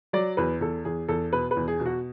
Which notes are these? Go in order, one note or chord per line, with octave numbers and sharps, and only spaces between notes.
F#3 D5
E2 B4
E2 A4
E2 G#4
E2 A4
B2 B4
B4
E2
G#4
B2
F#4